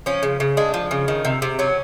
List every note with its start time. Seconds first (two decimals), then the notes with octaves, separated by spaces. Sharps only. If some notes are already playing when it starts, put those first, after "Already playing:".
0.06 F3 C#4
0.23 C#3
0.40 C#3
0.57 G#3 D4
0.74 F3
0.91 C#3
1.08 D#3
1.25 C3
1.42 C3
1.59 F#3 C#4